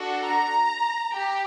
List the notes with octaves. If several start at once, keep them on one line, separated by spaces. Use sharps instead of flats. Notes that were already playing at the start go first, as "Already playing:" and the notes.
Already playing: D4 F#4 A4
A#5
G4